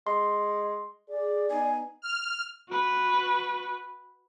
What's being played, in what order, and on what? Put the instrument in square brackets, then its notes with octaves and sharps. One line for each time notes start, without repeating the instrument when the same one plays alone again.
[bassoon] G#3 [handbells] C6
[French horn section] G#4 [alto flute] D5
[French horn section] B3 D#4 [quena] G#5
[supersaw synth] F6
[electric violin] F#4 B4